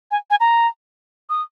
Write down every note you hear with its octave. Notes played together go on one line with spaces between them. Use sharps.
G#5
G#5
A#5
D#6